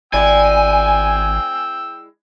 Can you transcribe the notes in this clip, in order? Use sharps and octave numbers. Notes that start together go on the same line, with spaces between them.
G#1 G#3 E4 D5 G5 G#5 E6